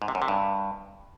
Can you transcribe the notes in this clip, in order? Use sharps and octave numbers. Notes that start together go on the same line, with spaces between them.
G#2
C3
F#2
C3
G2